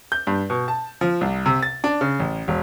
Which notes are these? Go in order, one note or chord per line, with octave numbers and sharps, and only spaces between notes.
G6
G2
B2
A5
F3
C2
C3
A6
D4
C#3
A1
E1